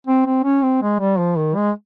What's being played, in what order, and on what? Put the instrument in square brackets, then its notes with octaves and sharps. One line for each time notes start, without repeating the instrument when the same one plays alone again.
[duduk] C4
C4
C#4
C4
G#3
G3
F3
D#3
G#3